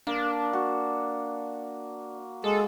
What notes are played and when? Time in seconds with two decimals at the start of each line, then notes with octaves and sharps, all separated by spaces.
0.07 A#3 D4
0.53 F#4
2.44 G#3 A4